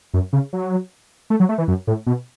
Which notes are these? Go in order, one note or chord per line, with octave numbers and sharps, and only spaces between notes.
F#2
C#3
F#3
A3
F#3
A3
E3
F#2
A2
B2